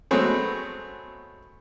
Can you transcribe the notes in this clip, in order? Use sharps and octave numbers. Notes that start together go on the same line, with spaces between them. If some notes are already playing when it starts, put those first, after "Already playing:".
F#3 G#3 A3 B3 C4 G#4